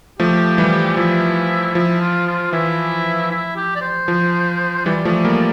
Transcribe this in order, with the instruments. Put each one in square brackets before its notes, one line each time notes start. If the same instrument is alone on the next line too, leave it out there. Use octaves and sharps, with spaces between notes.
[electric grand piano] F3 A3 [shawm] G4
[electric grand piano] E3 G3
[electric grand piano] F3 [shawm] E4
[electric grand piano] F3 [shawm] E4
[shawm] F4
F4
[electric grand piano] E3 [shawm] E4
[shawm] E4
G4
D5
C5
[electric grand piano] F3
[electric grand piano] E3 G3 [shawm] D5
[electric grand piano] F3 A3
G3 A#3